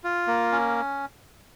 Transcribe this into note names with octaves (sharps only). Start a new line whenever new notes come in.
F4
A#3
C#4